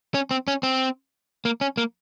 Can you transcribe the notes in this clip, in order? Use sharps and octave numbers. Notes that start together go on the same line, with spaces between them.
C#4
C4
C#4
C4
A#3
C#4
A#3